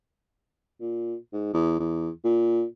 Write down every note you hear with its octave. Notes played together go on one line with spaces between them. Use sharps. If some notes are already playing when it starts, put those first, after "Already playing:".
A#2
G#2
E2
E2
A#2